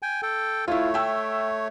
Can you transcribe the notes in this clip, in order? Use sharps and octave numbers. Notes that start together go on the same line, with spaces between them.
G5 G#5
A4 G5
A3 E4 F4 C#5
E5 G5 E6